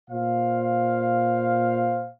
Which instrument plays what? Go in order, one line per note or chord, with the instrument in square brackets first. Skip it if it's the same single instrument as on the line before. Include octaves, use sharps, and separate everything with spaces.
[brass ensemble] A#2 C5 F5